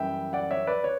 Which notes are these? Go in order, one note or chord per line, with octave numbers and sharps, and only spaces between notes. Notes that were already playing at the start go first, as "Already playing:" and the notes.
Already playing: F#2 E3 G3 E5 G5
D5 F#5
C#5 E5
B4 D5
C#5